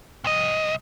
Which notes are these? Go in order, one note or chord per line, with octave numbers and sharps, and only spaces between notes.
C2 D#5